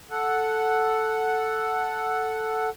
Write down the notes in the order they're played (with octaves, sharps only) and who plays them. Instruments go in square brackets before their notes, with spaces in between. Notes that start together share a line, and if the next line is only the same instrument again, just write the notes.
[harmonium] A4 F#5